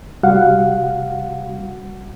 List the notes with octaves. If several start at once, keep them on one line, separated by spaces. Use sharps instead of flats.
C3 G3 F#4 F5 F#5